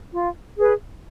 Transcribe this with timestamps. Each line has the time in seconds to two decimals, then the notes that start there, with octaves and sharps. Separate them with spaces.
0.13 F4
0.57 G#4 B4